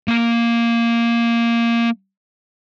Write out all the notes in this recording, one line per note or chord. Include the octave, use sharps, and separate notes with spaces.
A#3 F5